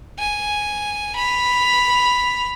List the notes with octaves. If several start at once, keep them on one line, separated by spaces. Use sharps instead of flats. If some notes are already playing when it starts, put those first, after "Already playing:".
G#5
B5 F7